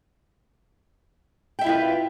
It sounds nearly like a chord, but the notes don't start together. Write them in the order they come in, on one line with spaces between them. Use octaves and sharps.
G5 E5 E4 F4 B4